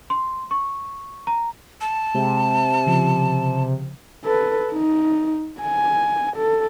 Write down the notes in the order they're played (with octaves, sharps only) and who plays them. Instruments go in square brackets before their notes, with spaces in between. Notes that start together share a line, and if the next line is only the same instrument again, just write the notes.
[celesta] C6
C#6
A#5
[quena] A5
[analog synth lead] C3 [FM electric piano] G#3
[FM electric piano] C#3 F3
[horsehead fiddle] A4 B4
D#4
G#5
A4